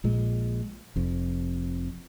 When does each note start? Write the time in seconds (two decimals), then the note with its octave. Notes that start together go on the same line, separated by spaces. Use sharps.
0.04 A#1 A#2 G#3
0.96 F1 F2